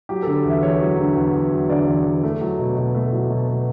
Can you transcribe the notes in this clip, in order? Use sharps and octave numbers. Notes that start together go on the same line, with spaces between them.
F#3 G4
D3 A4
E2 E5
E2 C#5
F#3
D3
E2
E2
F#3
D3 D5
E2
E2
A3
F#3
B2
B2
A3
F#3
B2
B2